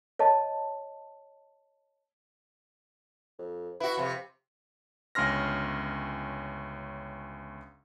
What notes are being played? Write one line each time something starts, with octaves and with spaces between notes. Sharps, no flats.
C#5 D#5 A5
F2
E4 F#4 B4
F2 C3
G1 C#2 C#4 C6 F6 A#6